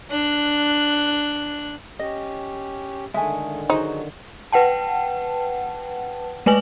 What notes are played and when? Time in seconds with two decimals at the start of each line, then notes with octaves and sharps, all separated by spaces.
0.11 D4 F#6
1.99 C#4 G4 D#5
3.14 D3 D#3 G#3 A3 E5 G#5
3.70 F#3 D#4 G#4 C5
4.52 B4 F#5 G5 A5
6.46 G#3 A3 B4 G#5 F#7